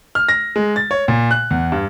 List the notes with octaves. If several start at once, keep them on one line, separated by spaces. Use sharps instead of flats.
F6
A#6
G#3
A6
C#5
A#2
F#6
E2
G2